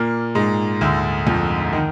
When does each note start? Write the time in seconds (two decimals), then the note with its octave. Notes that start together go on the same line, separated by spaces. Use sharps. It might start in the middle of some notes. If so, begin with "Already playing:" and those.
Already playing: A#2 A#3
0.35 G#2 G#3
0.81 D2 D3
1.27 F2 F3
1.73 D#3